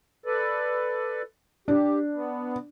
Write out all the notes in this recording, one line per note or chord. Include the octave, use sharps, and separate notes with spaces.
A4 B4 D5
D4 G4
B3